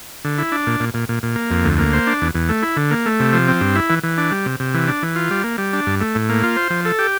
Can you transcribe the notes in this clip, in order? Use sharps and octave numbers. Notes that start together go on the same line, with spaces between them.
D3
E4
D4
A#2
A#2
A#2
A#2
A#2
A#3
F2
D2
A#3
C5
D4
E2
E2
A3
E4
D3
A#3
A3
C3
F3
C4
G2
E4
E3
E3
D4
G3
C3
C3
E3
D4
E3
F4
G3
A#3
G3
D4
G2
A3
A2
A#3
F4
C5
F3
A4
G4